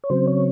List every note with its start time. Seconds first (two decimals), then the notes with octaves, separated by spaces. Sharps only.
0.04 C#5
0.10 C#3 F#3 C4 C5
0.27 C#5